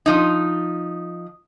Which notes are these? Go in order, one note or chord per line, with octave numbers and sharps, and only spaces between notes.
F3 D#4